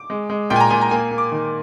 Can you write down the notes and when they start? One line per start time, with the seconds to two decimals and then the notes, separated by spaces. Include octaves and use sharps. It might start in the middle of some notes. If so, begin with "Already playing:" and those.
Already playing: D6
0.10 G#3
0.30 G#3
0.50 A#2 G5
0.56 G#5
0.60 A#5
0.70 A#2 G#5
0.81 A#5
0.91 A#3 G#5
1.11 A#3
1.18 D6
1.32 D#3